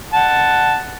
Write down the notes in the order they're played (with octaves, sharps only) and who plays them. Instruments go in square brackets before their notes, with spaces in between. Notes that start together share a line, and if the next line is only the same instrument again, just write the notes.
[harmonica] F#5 A5